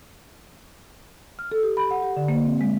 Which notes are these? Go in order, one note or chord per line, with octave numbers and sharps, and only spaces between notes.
F6
A4
G4
B5
F#5
G4
D3
A#3
C4
G#3